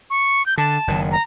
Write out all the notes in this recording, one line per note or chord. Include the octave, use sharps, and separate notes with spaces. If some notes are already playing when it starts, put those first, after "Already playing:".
C#6
G6
D3 A5
F#1 D#3
A#5